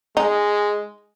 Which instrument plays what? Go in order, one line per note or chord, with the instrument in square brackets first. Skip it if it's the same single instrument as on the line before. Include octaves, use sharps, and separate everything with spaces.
[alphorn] G#3 [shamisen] D#4